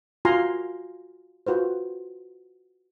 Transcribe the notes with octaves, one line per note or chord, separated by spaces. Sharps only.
F4 F#4 F5 G#5 A#5 C6
F4 F#4 B4 C5